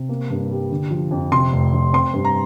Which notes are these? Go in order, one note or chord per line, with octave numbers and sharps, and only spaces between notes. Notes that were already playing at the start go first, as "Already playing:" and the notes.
Already playing: C3
A#3
G2
G3
D3
F3
F2
C3 C6
F1
F2
C4 C6
G2
A#5